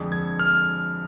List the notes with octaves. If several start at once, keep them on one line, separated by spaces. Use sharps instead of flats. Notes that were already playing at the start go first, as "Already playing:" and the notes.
Already playing: F2 D3 G#3
G#6
F6